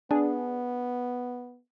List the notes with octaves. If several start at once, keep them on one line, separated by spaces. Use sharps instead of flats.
B3 D4 G#4